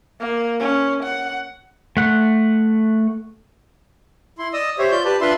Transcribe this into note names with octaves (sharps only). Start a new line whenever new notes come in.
A#3
C#4
F#5
A3 F#5
E4 C6
D5 D#5 D#6 E6
G4 C5 C#5 E5
F4 D5 G6
G4 B4 D5 A5
D4 F4 B4 E5 C6